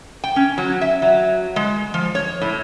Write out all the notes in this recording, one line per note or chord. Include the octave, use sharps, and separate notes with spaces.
G5
C#4
F#3
E5
F#3
G#3
F3
C#5
A2